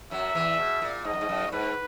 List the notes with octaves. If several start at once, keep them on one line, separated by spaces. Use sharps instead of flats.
F#2 F#3 E5
E2 E3
B2
A#2
G#2 D#5
F#2
G#2
F#2
A#2
G#2 B4